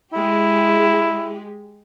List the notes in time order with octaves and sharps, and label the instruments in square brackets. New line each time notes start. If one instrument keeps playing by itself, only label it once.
[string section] G#3 G4 [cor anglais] E4